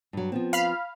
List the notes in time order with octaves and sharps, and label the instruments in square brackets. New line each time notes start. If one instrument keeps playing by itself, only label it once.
[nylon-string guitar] G2 F#3
F3 B3 C4
[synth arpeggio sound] F5 B5 F6